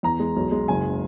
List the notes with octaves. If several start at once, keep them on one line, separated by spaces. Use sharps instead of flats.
E2 A#5
G#3
B1
G#3
F#1 G#5
C#3